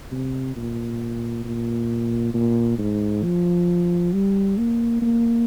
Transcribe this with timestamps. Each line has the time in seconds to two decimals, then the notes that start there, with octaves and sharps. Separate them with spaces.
0.11 C3
0.56 A#2
1.44 A#2
2.34 A#2
2.78 G#2
3.24 F3
4.13 G3
4.58 A#3
5.01 A#3